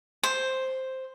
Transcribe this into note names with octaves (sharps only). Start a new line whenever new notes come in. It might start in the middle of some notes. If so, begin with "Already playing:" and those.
C5